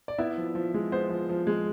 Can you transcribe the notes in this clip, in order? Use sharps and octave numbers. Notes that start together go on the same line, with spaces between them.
D5
B3 E4 E5
F3
F3
G#3
B3 C5
F3
F3
G#3